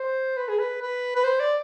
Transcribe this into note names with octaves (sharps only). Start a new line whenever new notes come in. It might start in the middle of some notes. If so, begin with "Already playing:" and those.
Already playing: C5
B4
G#4
B4
B4
B4
C5
D5